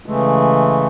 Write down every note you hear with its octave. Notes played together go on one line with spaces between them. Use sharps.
C#3 E3 G#3 A3